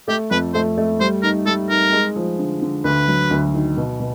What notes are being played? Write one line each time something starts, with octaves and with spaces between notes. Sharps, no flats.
A3 G4
F2 B4
A3 C5
A3
G3 C5
D#4 A#4
G3 A4
D#4 A#4
G#3
F3
D3
D3
D2 B4
F#3
D2
D#3
B2
B2